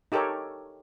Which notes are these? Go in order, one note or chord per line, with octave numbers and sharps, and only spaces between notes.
D#4 G4 A4 A#4 C#5